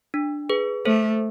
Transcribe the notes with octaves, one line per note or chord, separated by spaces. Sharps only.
D4
G#4 B4
A3 A4 C5